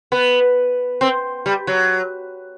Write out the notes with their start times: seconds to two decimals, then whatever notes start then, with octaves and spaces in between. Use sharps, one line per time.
0.12 B3
1.01 C4
1.46 G3
1.67 F#3